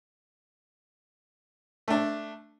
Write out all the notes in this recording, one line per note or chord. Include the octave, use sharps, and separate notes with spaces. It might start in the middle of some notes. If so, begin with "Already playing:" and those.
A3 D4